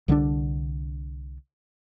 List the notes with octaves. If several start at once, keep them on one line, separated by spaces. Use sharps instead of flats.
C2 D3 G3 D4